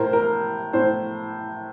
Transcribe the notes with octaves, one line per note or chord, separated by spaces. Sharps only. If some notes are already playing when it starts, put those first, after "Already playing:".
Already playing: A2 A#4 C5
A#4
A2 C5